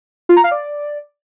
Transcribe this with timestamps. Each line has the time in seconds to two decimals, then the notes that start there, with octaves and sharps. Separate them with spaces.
0.29 F4
0.36 A#5
0.44 F5
0.51 D5